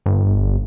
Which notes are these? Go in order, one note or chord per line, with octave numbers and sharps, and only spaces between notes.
G1